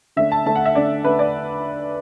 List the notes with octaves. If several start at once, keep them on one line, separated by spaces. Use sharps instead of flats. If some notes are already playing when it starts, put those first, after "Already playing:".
D3 A3 D4 E5
A5
D3 A3 D4 A5
F#5
E5
D3 A3 D4 D5
D3 A3 D4 B4
D5